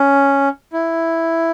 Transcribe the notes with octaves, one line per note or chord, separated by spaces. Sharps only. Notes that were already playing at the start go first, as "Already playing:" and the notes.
Already playing: C#4
E4